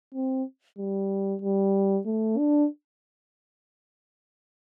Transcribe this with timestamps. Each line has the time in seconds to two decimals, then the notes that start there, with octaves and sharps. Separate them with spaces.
0.15 C4
0.78 G3
1.42 G3
2.06 A3
2.38 D4